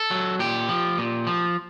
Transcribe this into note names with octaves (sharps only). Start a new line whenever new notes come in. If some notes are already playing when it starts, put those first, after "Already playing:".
Already playing: A4
F#3
A#2 G4
F3
A#2
F3